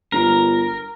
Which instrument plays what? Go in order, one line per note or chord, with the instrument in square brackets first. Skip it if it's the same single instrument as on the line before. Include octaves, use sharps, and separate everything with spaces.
[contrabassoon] G1 [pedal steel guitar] A#4